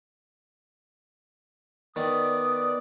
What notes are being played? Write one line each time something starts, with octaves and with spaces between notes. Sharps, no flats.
D#3 B3 D5 D#6